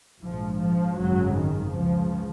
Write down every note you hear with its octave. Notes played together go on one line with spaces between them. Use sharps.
A#1 G#2 F3
F3
G#1 F#2 C#3 F#3
D#3
C#2 C#3 F3